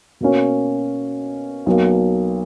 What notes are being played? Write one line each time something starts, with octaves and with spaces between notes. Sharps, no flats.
B2 A#3 C#4
B1 B2 A#3